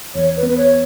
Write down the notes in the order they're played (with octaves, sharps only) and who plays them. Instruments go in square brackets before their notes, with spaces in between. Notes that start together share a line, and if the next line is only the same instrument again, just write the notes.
[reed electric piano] E2 [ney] C#5
[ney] B4
[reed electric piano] B3
[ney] B4
C#5